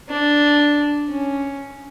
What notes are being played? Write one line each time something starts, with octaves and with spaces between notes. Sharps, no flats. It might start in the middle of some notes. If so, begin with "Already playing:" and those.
D4
C#4